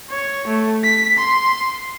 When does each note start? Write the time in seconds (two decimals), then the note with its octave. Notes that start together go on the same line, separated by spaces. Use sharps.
0.10 C#5
0.48 A3
0.84 B6
1.19 C6